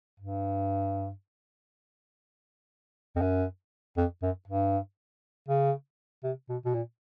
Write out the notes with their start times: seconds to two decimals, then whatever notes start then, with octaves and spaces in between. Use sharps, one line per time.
0.20 G2
3.16 F2
3.21 F#2
3.97 F2
4.23 F#2
4.48 G2
5.49 C#3
6.24 C3
6.49 B2
6.65 B2
6.74 A#2